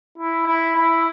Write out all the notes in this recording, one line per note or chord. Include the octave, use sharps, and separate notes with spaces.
E4
E4
E4